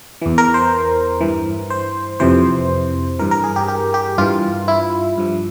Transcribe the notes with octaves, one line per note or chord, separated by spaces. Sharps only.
E2 E3
A#4
C5
G2 E3
C5
F2 C3 E3 C5
G2 E3 A#4
A#4
G#4
G4
G4
G4
G2 E3 F4
E4
G2 F3